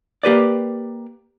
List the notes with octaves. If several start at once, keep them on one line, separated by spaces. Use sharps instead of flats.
A#3 G4 B4 D5